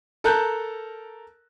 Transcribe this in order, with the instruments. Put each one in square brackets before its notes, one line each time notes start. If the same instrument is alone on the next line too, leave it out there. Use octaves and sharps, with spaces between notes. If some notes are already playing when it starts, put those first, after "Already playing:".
[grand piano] A4 A#4 A5 A#5 F#6 G6